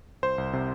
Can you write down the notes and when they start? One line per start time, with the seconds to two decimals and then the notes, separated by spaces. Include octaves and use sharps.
0.22 C2 C5
0.38 C2
0.53 C3